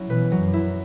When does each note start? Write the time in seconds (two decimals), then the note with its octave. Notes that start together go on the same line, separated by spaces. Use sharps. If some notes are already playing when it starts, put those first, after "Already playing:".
Already playing: F#3 C#4 E4
0.09 B2 E3 B4
0.32 F#3
0.38 F#2
0.53 E4